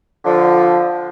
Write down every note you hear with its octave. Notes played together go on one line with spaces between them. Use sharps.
D3 F3